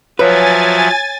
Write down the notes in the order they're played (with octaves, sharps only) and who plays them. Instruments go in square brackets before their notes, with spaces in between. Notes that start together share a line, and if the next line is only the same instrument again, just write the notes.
[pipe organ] F3 F#3 E5 [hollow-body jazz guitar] B4 [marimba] C#5 [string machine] G#5 A6